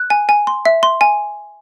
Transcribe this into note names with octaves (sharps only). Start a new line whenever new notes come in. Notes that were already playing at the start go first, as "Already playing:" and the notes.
Already playing: F#6
G#5
G#5
C6
E5
C6
G#5